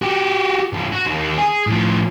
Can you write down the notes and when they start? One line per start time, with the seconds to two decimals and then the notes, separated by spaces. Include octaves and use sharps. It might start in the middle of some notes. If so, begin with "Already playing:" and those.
0.02 F#4 G4
0.73 C2 G2
0.92 F#4
1.06 D#2
1.38 G#4
1.67 A2 F3